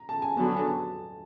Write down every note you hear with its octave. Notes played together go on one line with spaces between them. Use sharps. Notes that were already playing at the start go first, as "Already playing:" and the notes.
Already playing: A#5
A5
G#5
D3 F#3 B3 A5
G#5
A5